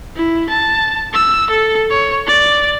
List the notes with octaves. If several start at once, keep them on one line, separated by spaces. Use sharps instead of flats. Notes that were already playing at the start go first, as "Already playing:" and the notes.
E4
A5
E6
A4
C#5
D5